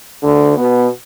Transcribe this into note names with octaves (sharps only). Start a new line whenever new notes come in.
D2 D3
B2 B3